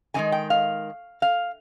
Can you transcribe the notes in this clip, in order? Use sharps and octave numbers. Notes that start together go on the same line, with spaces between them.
F2 D#3 G#3 G#5
G5
F5
F5